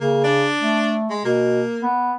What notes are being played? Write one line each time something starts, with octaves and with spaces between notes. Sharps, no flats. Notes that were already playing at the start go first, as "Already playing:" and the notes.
C#3 A#3
D4
A3
G#3
B2 A#3
B3